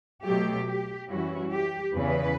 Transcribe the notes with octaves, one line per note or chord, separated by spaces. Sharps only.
B2 F#3 A3 G4
G4
F#2 E3 G3 C#4 E4 F#4
G4
E2 C#3 E3 B4